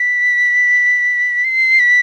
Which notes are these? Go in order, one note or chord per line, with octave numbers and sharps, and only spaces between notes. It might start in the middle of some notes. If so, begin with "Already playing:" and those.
Already playing: B6
C7
B6